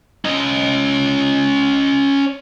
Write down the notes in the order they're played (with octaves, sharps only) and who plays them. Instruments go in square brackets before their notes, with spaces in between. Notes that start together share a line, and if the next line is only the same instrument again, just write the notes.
[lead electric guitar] C#4 D#5